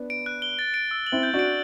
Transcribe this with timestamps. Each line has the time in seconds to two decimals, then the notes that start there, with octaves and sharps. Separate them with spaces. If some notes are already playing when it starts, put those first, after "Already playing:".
Already playing: B3 D4
0.10 D7
0.26 F#6
0.42 G7
0.59 A6
0.74 D7
0.91 E6
1.07 F#7
1.12 C4 E4
1.23 G6
1.34 D4 F#4
1.39 D7